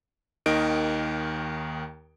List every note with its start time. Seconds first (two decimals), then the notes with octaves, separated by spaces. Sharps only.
0.46 D#2 D#3 D#5 D7